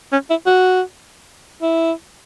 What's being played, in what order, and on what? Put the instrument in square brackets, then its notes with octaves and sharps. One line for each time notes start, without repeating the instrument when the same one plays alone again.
[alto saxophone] C#4
E4
F#4
E4